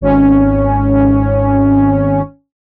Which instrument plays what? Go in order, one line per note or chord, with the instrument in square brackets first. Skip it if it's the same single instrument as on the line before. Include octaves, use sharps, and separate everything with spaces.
[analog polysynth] G#1 C#4